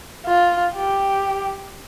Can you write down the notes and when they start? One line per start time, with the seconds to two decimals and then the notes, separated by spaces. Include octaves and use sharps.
0.26 F4
0.75 G4